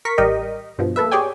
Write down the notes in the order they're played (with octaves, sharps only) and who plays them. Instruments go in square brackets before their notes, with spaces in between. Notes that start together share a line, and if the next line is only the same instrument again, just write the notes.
[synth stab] A#4 C#6 B6
A1 G3 G4 A#4 D#5
G2 B2 F3
A#3 A4 B4 E5
G4 G#4 C#5 D5 G5 G#5